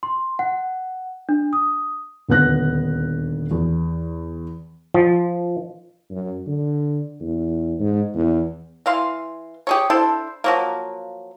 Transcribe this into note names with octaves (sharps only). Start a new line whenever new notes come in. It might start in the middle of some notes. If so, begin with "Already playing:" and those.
C6
F#5
D4
D#6
D#1 D2 B3 B4 F#6 A#6
E2
F3
F#2
D3
E2
G#2
E2
E3 F5 C6
G4 G#4 C#5
D4 E4 A4 C5
F3 F#3 A#3